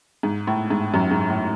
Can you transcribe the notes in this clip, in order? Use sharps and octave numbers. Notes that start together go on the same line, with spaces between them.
G#2
A2
G#2
F#2
G#2
A2